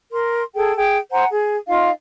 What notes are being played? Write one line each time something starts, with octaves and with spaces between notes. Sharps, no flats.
A#4 C6
G#4 A4 G5
G#4 G5
C5 F#5 G#5 A#5
G#4
D#4 F4 D#5 F5